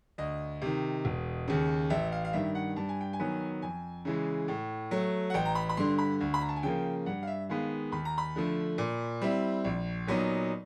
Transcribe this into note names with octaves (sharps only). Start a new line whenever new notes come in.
D2 D#5
C3 D#3
E1
D#2 C#3
A1 E5
F5
F5
G2 D#3 E5
F#5
G2 A5
G#5
G5
G#5
D#3 F#3 B3
F2 G#5
C#3 E3 G#3
A2
F#3 A3
F#5
A1 G5
A#5
B5
B5
G2 D3 C6
B5
D2
B5
A#5
A5
G#5
C#3 F3 A#3 G5
G2 F#5
F5
E5
D#3 G#3 B3 F5
D#2 B5
A#5
B5
D3 F3 A3
A#2
G3 C4 E4
A#1
A#2 F#3 B3 D#4